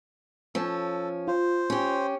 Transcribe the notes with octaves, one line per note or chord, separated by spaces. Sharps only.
F3 C#4 A4
F4 C5
C#4 G4